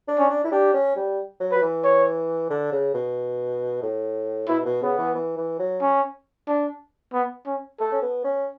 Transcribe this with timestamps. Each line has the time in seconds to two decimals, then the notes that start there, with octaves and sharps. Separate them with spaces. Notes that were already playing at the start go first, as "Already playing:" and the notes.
0.08 D4
0.19 C#4
0.30 D4
0.44 E4
0.52 D4 G4
0.74 C#4
0.96 G3
1.40 F#3
1.52 F#3 B4
1.62 E3
1.84 C#5
2.50 D3
2.72 C#3
2.94 B2
3.83 A2
4.48 B2 E4
4.65 B2
4.82 C#3 B3
4.98 E3
5.15 E3
5.37 E3
5.59 F#3
5.81 C#4
6.48 D4
7.13 B3
7.46 C#4
7.80 A3 A4
7.92 C#4
8.02 B3
8.24 C#4